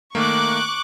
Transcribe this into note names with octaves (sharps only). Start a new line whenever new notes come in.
D#3 A3 A#3 C#6 D6 F#6